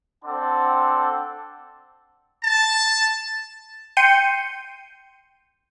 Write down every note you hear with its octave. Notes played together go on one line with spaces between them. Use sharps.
C4 D4 A4 D5 F#5 C6
A5
G5 C6 G6 C#7 D#7